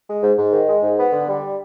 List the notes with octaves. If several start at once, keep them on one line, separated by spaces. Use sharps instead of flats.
G#3
G#2
G#2
D#3
G#3
G#2
B3
D3
G3